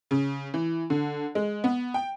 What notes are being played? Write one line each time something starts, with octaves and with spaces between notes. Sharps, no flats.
C#3
E3
D3
G#3
B3
G5